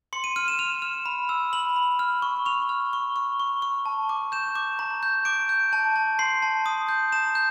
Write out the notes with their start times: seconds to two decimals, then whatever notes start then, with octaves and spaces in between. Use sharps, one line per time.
0.13 C6 C#7
0.24 D#7
0.36 F6 D#7
0.48 E7
0.59 F6 F7
0.82 F6
1.06 B5
1.29 E6
1.53 B5 F#7
1.76 B5
1.99 F6
2.22 C#6
2.46 C#6 F7
2.69 F6
2.93 C#6
3.16 C#6
3.40 C#6
3.62 C#6
3.86 A5
4.09 D6
4.32 G6 E7
4.55 D6
4.79 A#5
5.03 G6
5.25 D6 D7
5.49 G6
5.73 A5
5.96 A5
6.19 C6 C7
6.42 A5
6.66 D#6
6.89 G6
7.12 A#5 E7
7.35 G6